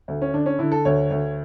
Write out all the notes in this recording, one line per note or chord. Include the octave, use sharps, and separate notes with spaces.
D2
C#4
D3 D4
C#4
D3 E4
A4
D2 C#5
D2